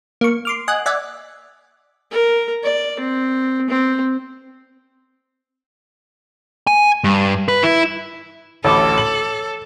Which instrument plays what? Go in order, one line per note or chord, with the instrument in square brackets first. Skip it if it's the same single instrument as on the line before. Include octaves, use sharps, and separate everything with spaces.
[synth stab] A#3 C#6
C6 D6 F6
D#5 F#5 G#5 F#6
D5 E5 F#5 G#5
[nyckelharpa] A#4
D5
C4
C4
[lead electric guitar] G#5
G2
B4
E4
[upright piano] A1 D2 [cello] A4 [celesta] C#5 A5 [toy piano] B5 D6
[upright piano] F#7